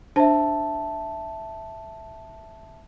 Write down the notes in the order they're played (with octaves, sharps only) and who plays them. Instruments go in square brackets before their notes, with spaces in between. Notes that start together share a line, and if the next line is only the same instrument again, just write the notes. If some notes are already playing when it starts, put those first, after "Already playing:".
[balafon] D4 C5 [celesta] E5 A5